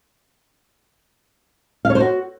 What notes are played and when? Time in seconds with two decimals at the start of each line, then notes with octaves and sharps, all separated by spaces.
1.85 F5
1.90 C#5
1.95 C5
2.00 F#4